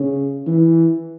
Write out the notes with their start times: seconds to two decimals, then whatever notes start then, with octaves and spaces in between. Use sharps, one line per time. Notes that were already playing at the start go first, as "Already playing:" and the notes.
Already playing: C#3
0.47 E3